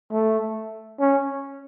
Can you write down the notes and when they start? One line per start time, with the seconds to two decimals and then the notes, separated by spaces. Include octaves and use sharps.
0.11 A3
1.00 C#4